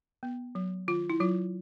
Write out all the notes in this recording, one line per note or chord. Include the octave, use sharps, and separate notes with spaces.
B3
F#3
D#3 F4
E4
F#3 F4